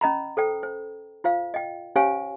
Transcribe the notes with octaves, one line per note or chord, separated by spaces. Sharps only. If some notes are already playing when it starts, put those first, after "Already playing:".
C#4 D#5 A#5 B5
A4 C5 G5
C5
F4 C5 F5
D#5 G5
C#4 G4 C5 C#5 F5 G#5